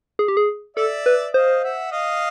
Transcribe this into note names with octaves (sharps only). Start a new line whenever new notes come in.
G#4
G4
G#4
A4 D5 E5
B4
C5 D#5 F5
E5 F#5
D#5 F5